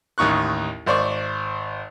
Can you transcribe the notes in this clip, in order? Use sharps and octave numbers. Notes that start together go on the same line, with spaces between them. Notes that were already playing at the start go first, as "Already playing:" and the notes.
A1 D#2 D#4 C#6 F#6
G#1 C5 D5 C#6